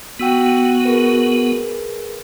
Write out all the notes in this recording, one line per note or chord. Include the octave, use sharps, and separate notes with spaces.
B3 F#4 G5 E6 B6
G#4 A#4 B4